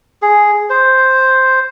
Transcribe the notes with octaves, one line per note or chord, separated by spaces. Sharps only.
G#4
C5